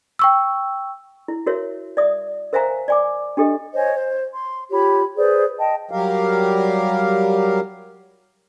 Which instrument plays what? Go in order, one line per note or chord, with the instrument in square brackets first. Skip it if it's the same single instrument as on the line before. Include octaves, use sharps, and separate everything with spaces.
[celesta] G5 C#6 E6
[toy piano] E4
F#4 A#4 C#5 E5
D5 E5 D#6
A#4 C5 E5 F5 G#5 A#5
D5 G#5 D6
D4 G4 A4 D#5
[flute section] C5 C#5 D#5 G#5
C5
C6
F4 G4 C#5 B5
G#4 B4 C5 D5
D#5 G5 A5
[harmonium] F#3 G3 G4 A#4 F5